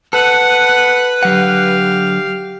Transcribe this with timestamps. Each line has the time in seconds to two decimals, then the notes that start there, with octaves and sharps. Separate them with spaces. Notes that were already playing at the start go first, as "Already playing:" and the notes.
0.13 A4 B4 F#5
1.23 D3 F#3 G4 F5 F#5